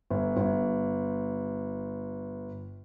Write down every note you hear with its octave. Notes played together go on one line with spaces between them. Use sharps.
G1
G1